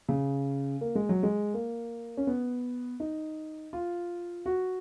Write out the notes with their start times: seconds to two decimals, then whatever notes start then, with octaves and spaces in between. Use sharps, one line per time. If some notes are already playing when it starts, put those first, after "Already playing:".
0.09 C#3
0.81 A#3
0.95 G#3
1.09 F#3
1.23 G#3
1.54 A#3
2.17 C#4
2.27 B3
3.00 D#4
3.73 F4
4.46 F#4